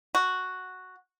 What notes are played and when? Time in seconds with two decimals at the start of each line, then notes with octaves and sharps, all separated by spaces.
0.15 F#4